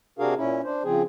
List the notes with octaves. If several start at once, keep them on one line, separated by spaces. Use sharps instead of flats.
C3 D4 F#4 G#4 A#4 F5
A#2 C#4 E4
D4 C5
C#3 F3 C4 G#4